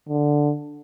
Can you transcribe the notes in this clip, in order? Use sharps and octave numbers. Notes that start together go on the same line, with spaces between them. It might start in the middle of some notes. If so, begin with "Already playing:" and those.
D3